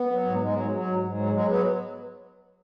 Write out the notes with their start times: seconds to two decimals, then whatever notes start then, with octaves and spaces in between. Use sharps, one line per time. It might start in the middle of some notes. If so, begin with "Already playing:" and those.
Already playing: B3
0.11 F#3
0.25 G#2
0.41 G#2 G#3
0.56 F#3
0.71 F#3
0.87 G#2
1.03 G#2
1.18 F#3
1.33 F#3 G#3
1.48 F#3 B3